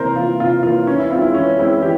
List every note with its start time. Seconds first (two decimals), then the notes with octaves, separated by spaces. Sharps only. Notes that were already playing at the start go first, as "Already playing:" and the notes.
Already playing: C3 E3 A#3 A#4 C5
0.16 E3 A#3 F4
0.40 C3 F4
0.63 E3 A#3 F4
0.87 E3 C#4
0.98 E4
1.10 C4 F4
1.15 G#3
1.22 E4
1.34 E3 C#4
1.58 G#3 C4 E4
1.82 E3 G4